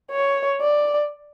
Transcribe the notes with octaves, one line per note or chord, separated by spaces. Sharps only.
C#5
D5